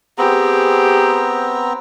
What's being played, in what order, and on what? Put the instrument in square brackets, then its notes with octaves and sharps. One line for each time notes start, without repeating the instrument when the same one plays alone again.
[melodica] B3 C4 A#5 [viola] G4 G#4